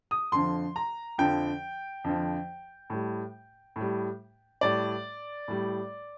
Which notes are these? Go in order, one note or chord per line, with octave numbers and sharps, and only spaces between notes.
D#6
F2 D3 F3 C6
A#5
F2 D3 F3 G5
F2 D3 F3
A2 G3
A2 G3
A2 G3 D5
A2 G3